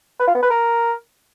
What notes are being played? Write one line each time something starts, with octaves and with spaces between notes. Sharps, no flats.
B4
F4
B3
B4
A#4